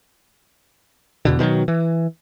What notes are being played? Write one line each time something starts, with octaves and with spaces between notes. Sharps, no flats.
E2 B2 D3
B2 D#3 E3 F#3
E3